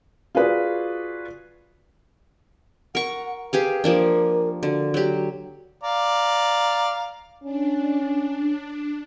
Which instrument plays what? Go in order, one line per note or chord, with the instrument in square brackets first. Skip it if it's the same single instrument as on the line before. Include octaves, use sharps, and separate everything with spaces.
[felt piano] F4 F#4 G#4 B4 D5
[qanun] A#4 C#6 [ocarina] F#5
[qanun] G4 G#4 F5 [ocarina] B4
[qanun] F3 A#3 D4 [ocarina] A#4
[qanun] D3 [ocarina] F#4
[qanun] F#3 G4
[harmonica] D5 F5 A#5
[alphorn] C#4 [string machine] D4